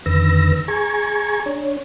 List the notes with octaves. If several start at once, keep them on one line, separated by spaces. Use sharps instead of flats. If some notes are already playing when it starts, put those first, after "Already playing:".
F2 D3 D#3 B4 E6 A#6
G#4 G#5 A#5 C#6 G#6
D4 C#5